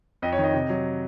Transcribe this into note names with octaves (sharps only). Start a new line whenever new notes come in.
F2 D#5
C#5
D#3
D#5
C3
F#3